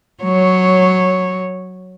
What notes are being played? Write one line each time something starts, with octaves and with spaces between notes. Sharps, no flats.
F#3 C#5